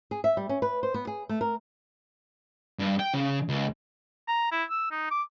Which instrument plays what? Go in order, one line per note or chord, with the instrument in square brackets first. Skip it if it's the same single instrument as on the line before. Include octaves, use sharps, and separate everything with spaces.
[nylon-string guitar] G#4
E5
G3
C#4
B4
C5
B3
G#4
A3
A#4
[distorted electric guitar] G2
G5
C#3
C#2
[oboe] A#5
E4
E6
D#4
D6